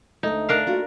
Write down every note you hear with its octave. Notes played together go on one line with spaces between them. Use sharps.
D2 A3 D#4
D4 A#4 F5
A#3 F4 F#4